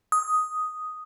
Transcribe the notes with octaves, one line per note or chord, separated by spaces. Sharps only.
D#6